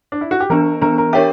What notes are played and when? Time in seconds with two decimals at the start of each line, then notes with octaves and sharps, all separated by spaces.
0.12 D4
0.21 E4
0.31 F#4
0.40 G4
0.50 E3 B3 D4 A#4
0.81 E3 B3 D4 A#4
0.98 A#4
1.13 D4 G4 A#4 C#5 E5